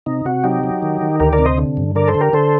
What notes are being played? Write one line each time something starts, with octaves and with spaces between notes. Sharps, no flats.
C3 D#4
C3 F#4
F#3 D#4 G4
F#3
D#3
D#3
D2 G4 A#4
A#4 D5
C3
C5 D#5
D3
G2
D3 A#4 D5
A4 C5
D3
G4 A#4
D3 A4 C5